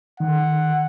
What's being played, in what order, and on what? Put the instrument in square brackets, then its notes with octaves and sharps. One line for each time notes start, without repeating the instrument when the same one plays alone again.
[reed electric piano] D#3 [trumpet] F#5